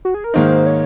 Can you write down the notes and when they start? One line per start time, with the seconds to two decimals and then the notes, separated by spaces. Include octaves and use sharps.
0.05 F#4
0.14 G#4
0.24 A#4
0.34 G#2 D#3 A#3 D#4 C5
0.66 C#5